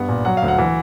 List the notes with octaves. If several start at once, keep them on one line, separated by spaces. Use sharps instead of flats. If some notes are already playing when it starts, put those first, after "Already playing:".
Already playing: G2 B3 F#5
A#2
F#3 F#5
F5
D2
F#5
E3